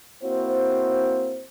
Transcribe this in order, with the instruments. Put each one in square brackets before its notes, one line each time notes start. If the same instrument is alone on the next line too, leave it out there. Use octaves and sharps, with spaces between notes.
[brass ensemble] A#3 C4 E4 F#4 C5